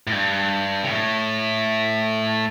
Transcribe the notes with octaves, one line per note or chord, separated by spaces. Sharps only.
A2
G2
C3
A2